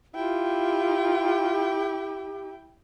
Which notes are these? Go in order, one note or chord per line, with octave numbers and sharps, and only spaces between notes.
E4 F4 G4 G5